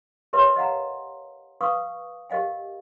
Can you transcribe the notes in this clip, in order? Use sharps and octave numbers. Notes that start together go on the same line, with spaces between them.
G4 A#4 B4 C#5 E5 C6
D#5 F5 F#5 A#5
B4 F5 C#6 D#6
G4 A#4 D#5 F5 G5